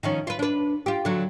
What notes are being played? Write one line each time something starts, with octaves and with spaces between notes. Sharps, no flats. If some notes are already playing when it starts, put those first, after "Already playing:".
D#3 F3 C#4
F4 B4
D4 B4
F4 G4
D3 F#3